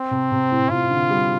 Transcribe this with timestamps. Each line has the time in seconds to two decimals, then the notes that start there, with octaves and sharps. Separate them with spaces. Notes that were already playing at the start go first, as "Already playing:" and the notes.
Already playing: C4
0.11 C3
0.32 C3
0.52 A2
0.70 C3 F4
0.91 D3
1.10 G3